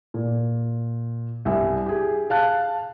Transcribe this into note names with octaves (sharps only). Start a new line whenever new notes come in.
A#2
C2 G2 E5 G#5
G4 G#4
F5 A5 F#6